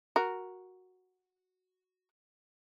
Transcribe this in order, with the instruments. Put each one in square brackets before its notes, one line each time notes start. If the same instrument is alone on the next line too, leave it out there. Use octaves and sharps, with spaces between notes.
[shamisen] F#4 A#4